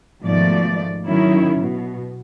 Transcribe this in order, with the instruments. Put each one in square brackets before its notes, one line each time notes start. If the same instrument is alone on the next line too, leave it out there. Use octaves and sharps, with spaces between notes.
[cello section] G#2 B2 D#3 F3 A3 D5
D#3 F#3 C#4 E4
B2